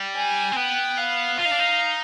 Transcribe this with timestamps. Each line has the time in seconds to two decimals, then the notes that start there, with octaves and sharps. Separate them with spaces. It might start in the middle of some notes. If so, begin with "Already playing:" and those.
Already playing: G3
0.16 G#5
0.52 C4
0.56 B3 G5
0.97 F5
1.38 F4 F5
1.45 D#4
1.53 D4
1.60 D#4